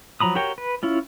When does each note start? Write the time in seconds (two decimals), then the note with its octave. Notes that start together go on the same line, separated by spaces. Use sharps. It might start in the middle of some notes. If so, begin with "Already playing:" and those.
0.20 F3 F#3 A#5 B5 D#6
0.35 F#4 G4 A#4 C#5 G5
0.58 B4
0.83 C#4 E4 F4